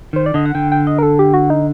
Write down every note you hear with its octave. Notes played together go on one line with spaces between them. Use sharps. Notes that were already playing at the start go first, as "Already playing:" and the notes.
D#3 C5
D5
D3 D#5
F#5
D3 G5
G5
D#5
A#4
A4
G4
F#4
D#4